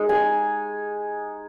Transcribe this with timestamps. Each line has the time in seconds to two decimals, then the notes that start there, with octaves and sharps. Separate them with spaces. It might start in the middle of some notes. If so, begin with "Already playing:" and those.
Already playing: G#3 D#4
0.09 G#5